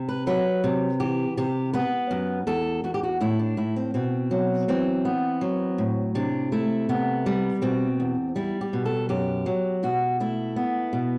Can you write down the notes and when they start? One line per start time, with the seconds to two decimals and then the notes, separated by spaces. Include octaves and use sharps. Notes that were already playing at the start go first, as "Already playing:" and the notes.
Already playing: C3
0.09 B4
0.27 F#3 B4
0.64 C3
1.00 E3 G4
1.37 C3 G4
1.73 B3 B4
2.11 F#2
2.47 E2 A4
2.84 E2 F#4
2.94 G4
3.03 F#4
3.21 A2 E4
3.39 D4
3.57 A2 E4
3.76 C4
3.94 B2 C4
4.31 F#3
4.68 E3 C4
5.05 B3
5.41 F#3
5.78 A2
6.15 C3 D4
6.52 A3 E4
6.89 C3 B3
7.26 G3
7.62 B2 C4
8.00 E2
8.36 G3 E4
8.61 G4
8.73 B2
8.85 A4
9.09 F#2 G4
9.46 F#3
9.83 B2 F#4
10.20 A3 E4
10.56 B3
10.93 B2